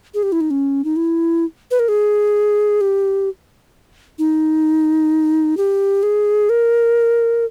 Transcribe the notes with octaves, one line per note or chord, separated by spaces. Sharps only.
G#4
G4
E4
D#4
C#4
D#4
E4
B4
A#4
G#4
G4
D#4
G4
G#4
A#4